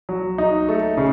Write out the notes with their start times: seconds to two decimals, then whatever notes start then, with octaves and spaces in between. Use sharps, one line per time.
0.09 F#3
0.38 D#4
0.69 A3
0.97 C#3